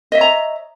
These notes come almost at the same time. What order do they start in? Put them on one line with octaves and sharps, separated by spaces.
D#5 E5 C#5 A#5